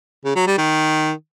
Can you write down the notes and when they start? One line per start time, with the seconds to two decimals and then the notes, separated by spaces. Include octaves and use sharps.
0.25 C#3
0.36 F#3
0.47 G3
0.58 D#3